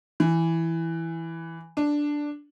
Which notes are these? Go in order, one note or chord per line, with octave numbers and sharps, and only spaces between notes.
E3
D4